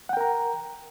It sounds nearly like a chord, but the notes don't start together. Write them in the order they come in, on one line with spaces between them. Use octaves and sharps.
F#5 G5 A#4 A#5